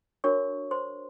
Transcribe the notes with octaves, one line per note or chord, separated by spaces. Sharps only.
D4 F#4 A#4 C#5 C#6
C5 C6